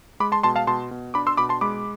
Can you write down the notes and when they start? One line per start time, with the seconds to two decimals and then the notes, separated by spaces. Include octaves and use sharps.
0.20 G#3 B5 D6
0.32 A5 C6
0.43 B2 A5 C6
0.56 F5 A5
0.67 B2 A5 C6
0.91 B2
1.14 D4 B5 D6
1.27 C6 E6
1.37 B2 B5 D6
1.49 A5 C6
1.61 G#3 B5 D6